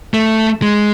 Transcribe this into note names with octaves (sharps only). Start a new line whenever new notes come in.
A3
G#3